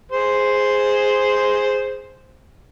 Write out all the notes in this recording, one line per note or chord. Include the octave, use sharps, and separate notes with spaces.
G#4 C5 C6